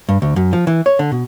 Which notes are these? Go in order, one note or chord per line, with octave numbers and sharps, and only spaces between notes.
G2
D2
F#2
F3
E3
C#5
D3
B2